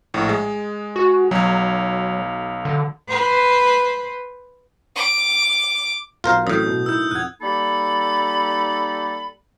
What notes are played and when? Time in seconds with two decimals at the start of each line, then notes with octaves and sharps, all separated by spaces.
0.14 A#1 A2
0.29 G#3
0.96 F#4
1.31 B1 F#3 G#6
2.65 D3
3.08 B4 C5
4.96 D6
6.24 B1 F4 A#4 C5
6.47 F#2 A2 E3 C4 D#6 G6
6.66 B2
6.86 D#4 E4 A#4 E6 G6
7.11 F2 F#5 F#6 G#6
7.41 G3 A#3 D#4 A4 B5